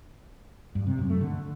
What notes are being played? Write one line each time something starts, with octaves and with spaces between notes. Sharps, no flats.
G2
C3
F#2
A3
D3